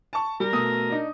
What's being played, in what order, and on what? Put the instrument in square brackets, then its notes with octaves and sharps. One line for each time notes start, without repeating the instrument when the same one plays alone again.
[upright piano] A5 C#6
[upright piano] G3 [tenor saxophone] A#4
[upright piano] B2 A3 D#6
D4 D#4